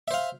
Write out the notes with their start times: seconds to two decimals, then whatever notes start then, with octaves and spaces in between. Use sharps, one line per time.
0.08 E5
0.11 C5
0.14 F5